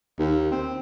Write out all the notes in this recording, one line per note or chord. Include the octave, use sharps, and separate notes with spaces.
D#2
C4